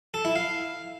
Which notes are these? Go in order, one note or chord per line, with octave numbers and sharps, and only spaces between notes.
A4
E4
F5